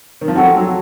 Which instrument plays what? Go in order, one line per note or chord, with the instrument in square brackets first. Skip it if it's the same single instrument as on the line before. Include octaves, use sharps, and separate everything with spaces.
[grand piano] D#3
F3
[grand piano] F#3 [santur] C4 F#4 A4 C#5
[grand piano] F#3